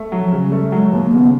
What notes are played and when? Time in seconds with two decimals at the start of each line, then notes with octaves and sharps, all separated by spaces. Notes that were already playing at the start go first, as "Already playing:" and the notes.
Already playing: A3
0.12 F#3
0.19 F3
0.32 C#3
0.45 G3
0.52 A3
0.71 F#3 G#3
0.92 D#2 A#3
1.12 C#3 B3